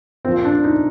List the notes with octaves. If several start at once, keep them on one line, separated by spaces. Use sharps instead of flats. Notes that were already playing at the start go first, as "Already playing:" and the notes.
A#2 F3 C4
D4
D#4